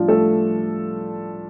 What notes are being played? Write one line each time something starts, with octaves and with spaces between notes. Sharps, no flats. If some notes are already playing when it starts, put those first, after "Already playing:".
Already playing: A2 F3 G3 D4 F4
A3 A4